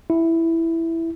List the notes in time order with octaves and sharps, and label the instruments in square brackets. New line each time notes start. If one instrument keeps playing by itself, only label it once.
[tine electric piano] E4